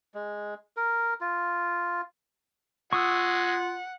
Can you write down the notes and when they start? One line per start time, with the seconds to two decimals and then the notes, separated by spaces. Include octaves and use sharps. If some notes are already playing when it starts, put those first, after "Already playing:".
0.14 G#3
0.77 A#4
1.21 F4
2.93 G#3 F4 F#5 C#6 D#6 E6